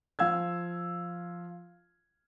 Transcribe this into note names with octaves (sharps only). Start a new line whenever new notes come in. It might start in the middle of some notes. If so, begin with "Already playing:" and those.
F3 F5 E6 G#6